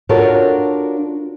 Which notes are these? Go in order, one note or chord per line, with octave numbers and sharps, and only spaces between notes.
D4 F4 F#4 A4 A#4 C#5